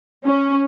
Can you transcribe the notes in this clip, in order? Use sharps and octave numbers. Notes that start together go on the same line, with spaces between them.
C#4